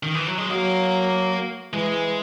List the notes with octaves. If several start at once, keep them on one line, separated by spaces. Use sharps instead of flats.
D#3
E3
F#3
G#3
F#3 A#3
E3 G#3